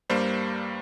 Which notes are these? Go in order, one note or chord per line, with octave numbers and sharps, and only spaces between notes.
G2 G3 A#3 C5